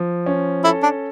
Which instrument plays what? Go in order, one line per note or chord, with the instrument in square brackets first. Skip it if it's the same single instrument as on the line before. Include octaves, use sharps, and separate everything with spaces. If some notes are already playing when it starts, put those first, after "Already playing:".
Already playing: [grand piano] F3
C#4
[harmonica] E4 [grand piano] A4
[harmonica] D4